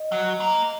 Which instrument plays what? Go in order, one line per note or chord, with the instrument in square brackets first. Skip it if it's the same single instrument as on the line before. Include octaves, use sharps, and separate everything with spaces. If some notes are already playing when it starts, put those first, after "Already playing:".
Already playing: [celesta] D#5
[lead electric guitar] F#3
A#3